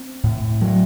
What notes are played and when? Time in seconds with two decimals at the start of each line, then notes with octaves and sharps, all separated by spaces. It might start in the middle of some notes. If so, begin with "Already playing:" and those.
Already playing: C4
0.23 A2
0.61 F#3